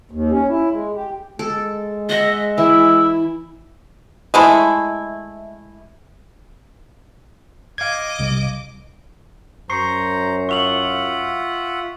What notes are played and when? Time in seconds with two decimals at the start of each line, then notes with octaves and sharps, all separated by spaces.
0.11 D#2
0.31 C#4
0.49 E4
0.71 G#3
0.95 G4
1.39 G#3 A4
2.09 D#5 E5 F#5
2.58 E3 E4 E5
4.34 G#3 A3 E4
7.78 D#5 F5 D6 G#6
8.19 B1 C3 G3
9.70 F#2 C5 A#5 C#6 C7 C#7
10.49 F4 E5 F#5 C#6 F7 F#7